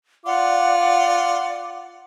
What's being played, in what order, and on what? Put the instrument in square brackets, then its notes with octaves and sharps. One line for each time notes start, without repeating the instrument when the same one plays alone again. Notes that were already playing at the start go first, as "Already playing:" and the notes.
[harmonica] F4 [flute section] D5 F#5 D6